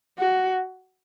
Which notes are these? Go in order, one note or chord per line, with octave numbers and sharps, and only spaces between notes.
F#4